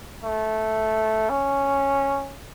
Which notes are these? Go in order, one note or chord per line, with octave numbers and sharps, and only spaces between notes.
A3
C#4